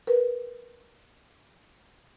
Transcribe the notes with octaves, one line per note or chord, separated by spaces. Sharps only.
A#4 B4